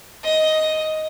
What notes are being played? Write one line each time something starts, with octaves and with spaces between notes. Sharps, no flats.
D#5